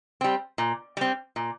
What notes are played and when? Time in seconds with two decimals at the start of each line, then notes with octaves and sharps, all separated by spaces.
0.21 G3 C4
0.58 A#2
0.97 G3 C4
1.36 A#2